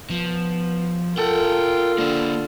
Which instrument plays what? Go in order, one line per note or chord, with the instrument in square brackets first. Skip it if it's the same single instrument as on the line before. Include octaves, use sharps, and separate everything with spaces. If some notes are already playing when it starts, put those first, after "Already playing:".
[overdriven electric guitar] F3 [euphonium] B3
[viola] F4 [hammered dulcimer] A4 [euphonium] A#4 [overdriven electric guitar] F#5 G5
[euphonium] D3 [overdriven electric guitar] A#3 C5